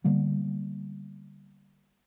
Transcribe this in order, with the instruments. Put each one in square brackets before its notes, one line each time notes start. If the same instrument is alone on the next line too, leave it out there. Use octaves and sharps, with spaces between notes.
[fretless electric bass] D3 G3 A#3 B3